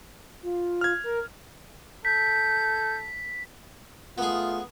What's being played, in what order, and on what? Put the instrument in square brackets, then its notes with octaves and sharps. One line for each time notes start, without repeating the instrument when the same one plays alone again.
[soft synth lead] F4
[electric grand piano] F6 G#6
[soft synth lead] A#4
[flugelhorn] A4 [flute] G6 [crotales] B6
[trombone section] A3 F4 [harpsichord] B3 G#4